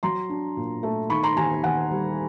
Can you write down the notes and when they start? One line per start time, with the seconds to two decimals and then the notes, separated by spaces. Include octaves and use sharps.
0.03 F#3 A#5 C6
0.30 D4
0.57 A#2
0.83 A3
1.10 D#3 B5 C#6
1.23 A#5 C6
1.37 D#2 G#5 A#5
1.63 D#2 F#5 G#5
1.91 G3